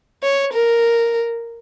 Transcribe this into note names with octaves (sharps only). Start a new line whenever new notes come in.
C#5
A#4